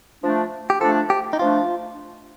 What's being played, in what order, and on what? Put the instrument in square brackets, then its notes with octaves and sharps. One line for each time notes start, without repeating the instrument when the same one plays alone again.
[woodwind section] F3 A3 D4
[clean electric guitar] G4
[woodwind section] F3 A3 D4 [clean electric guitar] A4
[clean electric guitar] G4
D#4
[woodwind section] F3 A3 D4 [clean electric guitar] F4